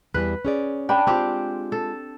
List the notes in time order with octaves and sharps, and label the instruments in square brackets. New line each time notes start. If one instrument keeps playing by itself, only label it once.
[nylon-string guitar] E2 E3 G3 [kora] B4
[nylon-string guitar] C#4 G#4 D5
[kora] D4 [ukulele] G5 B5
[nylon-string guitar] G#3 F4 [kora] C4 G4
[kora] A4